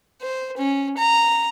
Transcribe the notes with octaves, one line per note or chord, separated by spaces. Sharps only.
C5
C#4
A#5